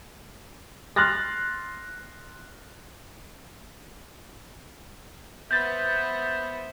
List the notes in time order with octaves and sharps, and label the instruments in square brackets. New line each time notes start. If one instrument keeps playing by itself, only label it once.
[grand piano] C6 F6 F#6 A6 A#6
[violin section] B3 [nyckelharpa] C5 E5 [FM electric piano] G6 A6